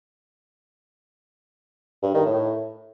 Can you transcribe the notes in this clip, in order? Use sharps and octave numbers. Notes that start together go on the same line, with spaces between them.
G2
D#3
A2